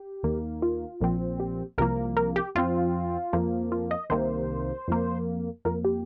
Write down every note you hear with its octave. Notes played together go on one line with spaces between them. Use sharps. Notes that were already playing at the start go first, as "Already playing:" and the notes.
Already playing: G4
D#2 D#3 A#3
F4
A#1 A#2 F3 C4
G4
C2 C3 F3 A#3 A#4
A#4
G4
F2 F3 C4 F4
F2 F3 A#3
F4
D#5
C2 C3 D#3 A#3 C5
F2 F3 A#3
F2 F3 A#3 A#4
G4